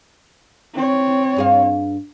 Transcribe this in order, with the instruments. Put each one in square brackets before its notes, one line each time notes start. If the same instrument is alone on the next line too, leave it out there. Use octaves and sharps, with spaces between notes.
[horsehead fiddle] C4 C#5
[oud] G2 G#4 F5